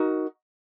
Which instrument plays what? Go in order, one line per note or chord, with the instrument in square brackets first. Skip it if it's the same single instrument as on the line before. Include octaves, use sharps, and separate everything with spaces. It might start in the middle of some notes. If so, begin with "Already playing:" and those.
Already playing: [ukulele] D#4 F#4 A#4